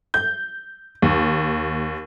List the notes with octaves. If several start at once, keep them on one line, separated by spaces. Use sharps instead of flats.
G6
D#2